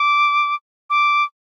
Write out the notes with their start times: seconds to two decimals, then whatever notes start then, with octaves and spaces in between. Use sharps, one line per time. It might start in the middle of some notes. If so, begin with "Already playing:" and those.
Already playing: D6
0.90 D6